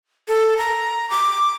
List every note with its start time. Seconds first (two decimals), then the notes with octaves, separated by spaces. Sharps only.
0.28 A4
0.58 A#5
1.10 D6